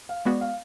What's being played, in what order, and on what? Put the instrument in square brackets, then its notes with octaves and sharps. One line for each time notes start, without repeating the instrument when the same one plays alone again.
[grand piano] F5
[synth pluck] G#3 B3 F#4 [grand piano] D5
[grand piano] F5